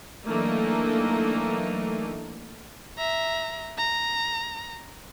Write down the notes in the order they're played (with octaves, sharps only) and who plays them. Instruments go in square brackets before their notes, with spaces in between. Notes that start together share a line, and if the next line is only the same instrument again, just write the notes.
[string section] E3 F#3 A3 A#3 D4 D#4
[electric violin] E5 A#5
A#5